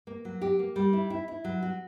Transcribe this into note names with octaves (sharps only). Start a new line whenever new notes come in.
A#3
F#3
G4
A#3
G3
E4
E4
E4
F#3
F#4